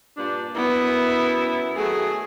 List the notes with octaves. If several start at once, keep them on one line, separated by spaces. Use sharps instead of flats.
G2 A#2 D4
F#2 B3 E4
D#3 F#3 A3 G#4